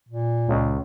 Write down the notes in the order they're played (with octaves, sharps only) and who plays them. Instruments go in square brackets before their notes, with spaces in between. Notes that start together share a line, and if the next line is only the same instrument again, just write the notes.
[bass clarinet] A#2
[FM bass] C#2